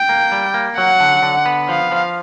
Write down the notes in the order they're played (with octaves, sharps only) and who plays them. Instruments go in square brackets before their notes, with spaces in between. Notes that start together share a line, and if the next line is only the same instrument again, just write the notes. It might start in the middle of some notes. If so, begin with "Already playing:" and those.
Already playing: [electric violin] G5
[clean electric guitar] A#3
G3
A#3
[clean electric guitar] F#3 [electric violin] F#5
[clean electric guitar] D3
D3
B3
[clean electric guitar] F3 [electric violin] F5
[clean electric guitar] F3